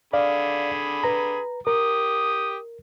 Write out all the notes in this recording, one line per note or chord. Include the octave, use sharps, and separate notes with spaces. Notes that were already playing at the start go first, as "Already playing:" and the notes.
D3 G#4 D5 F5 B5
B4 A#5
G4 A#4 D#6